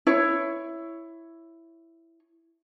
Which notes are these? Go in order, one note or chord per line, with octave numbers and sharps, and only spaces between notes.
E4 C#5